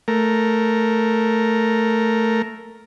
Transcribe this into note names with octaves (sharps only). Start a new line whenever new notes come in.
A3 A#4